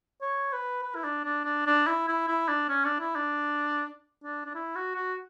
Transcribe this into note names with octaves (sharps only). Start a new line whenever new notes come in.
C#5
B4
B4
E4
D4
D4
D4
D4
E4
E4
E4
D4
C#4
D4
E4
D4
D4
D4
E4
F#4
F#4